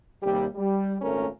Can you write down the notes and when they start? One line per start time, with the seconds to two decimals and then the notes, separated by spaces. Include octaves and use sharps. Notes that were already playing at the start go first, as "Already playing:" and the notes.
0.23 D#2 C3 G3
0.56 G3
1.02 G#1 A#2 A3 C#4 A#4